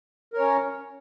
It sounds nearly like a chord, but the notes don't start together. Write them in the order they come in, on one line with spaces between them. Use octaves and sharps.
A#4 C#5 C#4